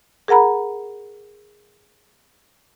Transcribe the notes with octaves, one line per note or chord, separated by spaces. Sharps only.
G#4 A#4 F#5 A#5 B5